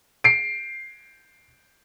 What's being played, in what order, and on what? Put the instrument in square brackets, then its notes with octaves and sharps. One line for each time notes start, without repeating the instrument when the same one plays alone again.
[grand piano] C7 D7